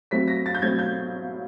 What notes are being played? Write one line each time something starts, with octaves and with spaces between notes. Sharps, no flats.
F#3 A3 C4 B6
A#6
A6
G6
F#3 A3 C4 G#6
G6